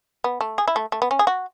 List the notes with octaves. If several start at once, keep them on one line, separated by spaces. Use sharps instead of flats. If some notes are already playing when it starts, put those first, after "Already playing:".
B3
A3
G#4
E4
A3
A3
B3
C#4
G#4
F#4